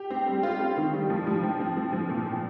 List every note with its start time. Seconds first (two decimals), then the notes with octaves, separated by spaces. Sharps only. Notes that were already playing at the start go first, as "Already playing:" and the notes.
Already playing: G4
0.10 C4
0.27 G3
0.43 F4
0.60 C4
0.77 D#3
0.94 G3
1.10 F3
1.27 F3
1.43 C4
1.60 C4
1.77 F3
1.93 F3
2.09 A#2
2.27 C4